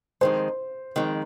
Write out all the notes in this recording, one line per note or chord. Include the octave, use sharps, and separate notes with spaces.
F2 D#3 G#3 C5
F2 D#3 G#3